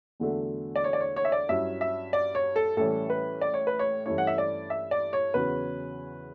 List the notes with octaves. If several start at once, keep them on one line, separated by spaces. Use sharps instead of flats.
E2 D3 F#3 A3 D4
D5
C#5
D5
C#5
C#5
E5
D5
G2 F#3 C#4 E4 E5
E5
D5
C#5
A4
A2 E3 G3 C#4 A4
B4
D5
C#5
B4
C#5
G2 E3 A3 C#4 E4 C#5
F#5
E5
D5
E5
D5
C#5
E2 C#3 F#3 C#4 B4